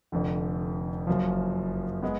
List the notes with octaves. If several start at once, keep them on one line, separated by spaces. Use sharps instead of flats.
F1 F2 D3
F#1 F#2 F3
G#3 B3